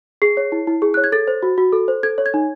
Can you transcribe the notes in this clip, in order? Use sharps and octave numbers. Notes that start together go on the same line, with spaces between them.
G#4 C7
C#5
E4
E4
G#4
C#5 F#6
G#6
A4 A6
C5
F#4
F#4
A4
C5
A4 G#6
C#5
G#6
D#4